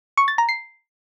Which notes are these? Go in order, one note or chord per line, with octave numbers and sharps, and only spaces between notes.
C#6
A6
A#5
C7